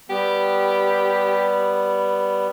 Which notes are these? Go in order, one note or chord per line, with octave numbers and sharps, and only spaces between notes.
G3 B3 G4